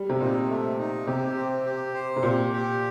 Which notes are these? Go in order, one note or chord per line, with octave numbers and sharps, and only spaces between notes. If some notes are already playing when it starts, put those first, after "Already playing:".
Already playing: G3
C3
A#2 D#4
A3
D#4
C3 G4
C4
G4
C5
C3
A#2 G4
G4